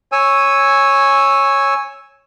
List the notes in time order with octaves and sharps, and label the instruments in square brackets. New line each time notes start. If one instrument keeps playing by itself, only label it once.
[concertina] C#5 G#5 E6